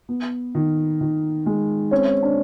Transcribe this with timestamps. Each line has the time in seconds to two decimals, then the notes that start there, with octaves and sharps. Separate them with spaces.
0.09 B3
0.55 D#3
1.01 D#3
1.46 G#3
1.91 C4 C#4
2.23 D4